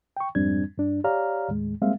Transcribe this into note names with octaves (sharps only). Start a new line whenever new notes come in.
G5 C#6
F2 G#2 G3 C4 D4 G#6
G2 D4
G4 C#5 D5 F5 A#5 F6
D#2 A2 G#3
G3 G#3 A#3 C4 E5 F5